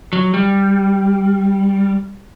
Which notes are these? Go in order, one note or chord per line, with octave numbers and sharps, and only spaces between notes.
F#3
G3